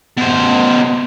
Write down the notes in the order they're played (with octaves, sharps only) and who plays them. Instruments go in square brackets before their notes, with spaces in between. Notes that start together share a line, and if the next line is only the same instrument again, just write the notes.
[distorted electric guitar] B2 C5